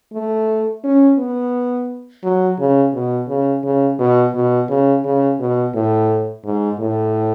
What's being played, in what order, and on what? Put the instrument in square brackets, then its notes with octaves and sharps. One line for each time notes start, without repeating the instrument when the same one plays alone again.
[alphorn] A3
C#4
B3
F#3
C#3
B2
C#3
C#3
B2
B2
C#3
C#3
B2
A2
G#2
A2